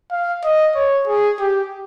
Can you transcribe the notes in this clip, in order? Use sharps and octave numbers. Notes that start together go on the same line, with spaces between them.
F5
D#5
C#5
G#4
G4